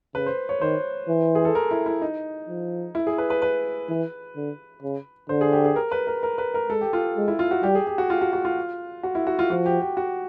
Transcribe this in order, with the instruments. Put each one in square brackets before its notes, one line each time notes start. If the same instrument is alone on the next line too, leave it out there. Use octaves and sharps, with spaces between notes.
[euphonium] C#3 [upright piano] B4
[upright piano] C5
C#5
[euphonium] D#3 [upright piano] C5
[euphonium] E3
[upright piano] G#4
A4
A#4
E4
E4
D#4
[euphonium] F3
[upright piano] E4
G#4
B4
B4
B4
[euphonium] E3
D3
C#3
[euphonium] D3 [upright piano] C5
[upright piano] G#4
G4
G#4
A#4
B4
A#4
A#4
B4
A#4
[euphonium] G#3 [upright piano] A4
[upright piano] G4
F4
[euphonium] G#3
[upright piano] E4
F4
F#4
[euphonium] G3 [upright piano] G4
[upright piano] G#4
G4
F#4
F4
F#4
F#4
F4
F#4
E4
F#4
F4
[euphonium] F3 [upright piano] F#4
[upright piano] G4
G4
F#4